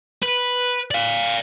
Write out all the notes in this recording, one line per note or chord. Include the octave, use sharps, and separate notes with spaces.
B4
D5 F5